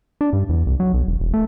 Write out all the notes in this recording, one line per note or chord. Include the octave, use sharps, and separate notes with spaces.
D4
G2
E2
C2
F#3
B1
E1
E1
A3